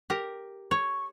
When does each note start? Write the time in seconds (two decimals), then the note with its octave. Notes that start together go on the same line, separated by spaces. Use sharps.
0.10 G4 A#4 A#5
0.71 C#5 C#6